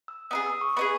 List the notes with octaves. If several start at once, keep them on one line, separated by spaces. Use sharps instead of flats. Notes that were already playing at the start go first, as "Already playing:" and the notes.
E6
B3 D#4 G#4 D#6
E6
C#6
B3 D#4 G#4 B5